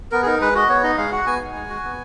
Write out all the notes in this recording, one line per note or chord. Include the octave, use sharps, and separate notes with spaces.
B3 A#4
G#4
D#4 A#4
G#3 B4
F#4 D#5
B3 C#5
D#4 D#5
G#3 F5
F#4 F#5
B3 G#5
D#4
G#3
F#4
B3